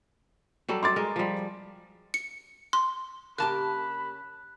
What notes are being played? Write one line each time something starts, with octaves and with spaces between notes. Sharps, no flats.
F#3 G3 A4
C6 D6 A6
G#3 A#4
F3 G3
C#7
C6
C#3 A#3 G4 A5 B5 F#6